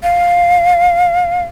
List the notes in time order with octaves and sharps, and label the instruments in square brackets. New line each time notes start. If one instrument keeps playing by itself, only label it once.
[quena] F5